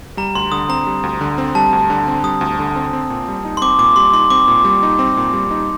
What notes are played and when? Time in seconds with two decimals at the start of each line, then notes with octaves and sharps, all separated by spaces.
0.17 G3 A#5
0.35 D2 C6
0.52 D3 D#6
0.69 C4 A#5
0.87 G3
1.03 D2
1.21 D3
1.38 C4
1.55 G3 A5
1.73 D2
1.90 D3
2.08 C4
2.24 G3 D#6
2.41 D2
2.59 D3
2.76 C4
2.93 C4
3.10 A#2
3.28 G3
3.45 D#4
3.57 C6
3.62 C4 D6
3.78 A#2 D6
3.96 G3 C6
4.13 D#4 C6
4.30 C4 D6
4.48 A#2
4.65 G3
4.83 D#4
4.99 C4
5.17 A#2
5.33 G3
5.51 D#4